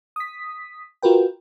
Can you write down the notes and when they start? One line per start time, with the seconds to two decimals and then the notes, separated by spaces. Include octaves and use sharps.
0.16 D#6 B6
1.02 F4 F#4 A#4 B4 G5